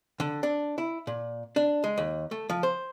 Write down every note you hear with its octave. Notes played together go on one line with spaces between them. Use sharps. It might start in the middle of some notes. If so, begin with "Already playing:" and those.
D3
D4
E4
A#2
D4
G#3
D#2
A3
F3
C5